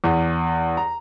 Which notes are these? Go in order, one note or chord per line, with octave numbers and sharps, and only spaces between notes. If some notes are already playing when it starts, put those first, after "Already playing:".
E2
A#5